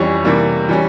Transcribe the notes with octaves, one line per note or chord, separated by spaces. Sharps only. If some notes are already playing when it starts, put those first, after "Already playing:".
Already playing: F2 E3 G3 C#4 C#6
C3 E3 G3 A#3
E3 G3 C#4